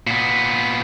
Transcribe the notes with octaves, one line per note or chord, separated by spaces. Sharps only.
A#2 B3